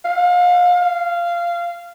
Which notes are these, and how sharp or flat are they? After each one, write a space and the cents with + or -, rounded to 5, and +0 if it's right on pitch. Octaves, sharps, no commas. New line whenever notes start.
F5 +35
F5 -15